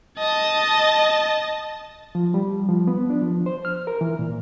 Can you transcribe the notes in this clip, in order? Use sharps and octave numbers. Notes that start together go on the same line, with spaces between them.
D#5 A5
F3
G3
F3
B3
D4
F3
C5
F6
A#4
E3
A#2